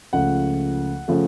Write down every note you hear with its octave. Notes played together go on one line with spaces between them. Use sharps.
C#2 C#3 F3 A3 F#5
C#3 F3 A3